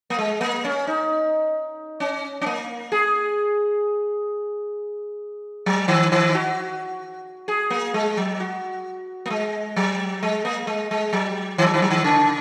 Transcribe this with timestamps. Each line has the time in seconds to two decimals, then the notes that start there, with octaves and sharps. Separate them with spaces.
0.10 A#3
0.19 G#3
0.41 A#3
0.64 C#4
0.87 D#4
2.00 C#4
2.41 C#4
2.46 A#3
2.92 G#4
5.66 F#3
5.88 D#3
6.12 D#3
6.35 F#4
7.48 G#4
7.70 A#3
7.94 G#3
8.17 F#3
8.40 F#4
9.26 A#3
9.30 G#3
9.76 F#3
10.23 G#3
10.45 A#3
10.67 G#3
10.91 G#3
11.13 F#3
11.58 D#3
11.67 F#3
11.74 D#3
11.82 F#3
11.90 D#3
12.04 C#3